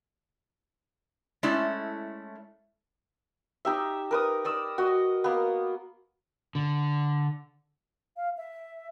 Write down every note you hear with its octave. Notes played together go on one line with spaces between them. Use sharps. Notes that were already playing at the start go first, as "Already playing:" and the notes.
G#3 A3 C#4 E4 A4 D5
D#4 G4 E5
A#4 B4 D#6
D5 D#6 E6
F#4 D#5
A#3 B3
D3
F5
E5